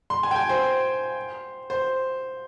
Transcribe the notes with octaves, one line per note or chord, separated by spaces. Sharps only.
C6
G#5
G5
G#5
C5
C5